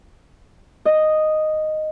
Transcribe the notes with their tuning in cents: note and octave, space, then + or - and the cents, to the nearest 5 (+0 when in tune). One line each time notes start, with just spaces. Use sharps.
D#5 -5